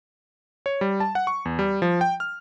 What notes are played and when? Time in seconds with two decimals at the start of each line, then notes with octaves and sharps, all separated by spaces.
0.66 C#5
0.81 G3
1.00 A5
1.15 F#5
1.27 C#6
1.45 E2
1.59 G3
1.82 F3
2.01 G5
2.20 F6